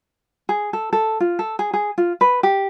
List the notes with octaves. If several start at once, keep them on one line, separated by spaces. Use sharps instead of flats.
G#4
A4
A4
F4
A4
G#4
G#4
F4
B4
G4